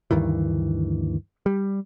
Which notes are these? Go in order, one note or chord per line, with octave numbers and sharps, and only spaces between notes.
D2 G2 D#3 E3
G3